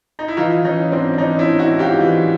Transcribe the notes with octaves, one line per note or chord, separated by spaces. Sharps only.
D#4
E4
E3 D#4 F4
E3 C#4 D#4
G#2 C4 D4
D4
E3 C#4 D#4
D4 E4
G#2
E4 F#4
G#2
F4 G4
E3